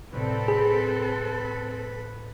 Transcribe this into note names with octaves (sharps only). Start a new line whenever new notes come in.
C2 A2 C4 A4 B4
G#4 B5 B6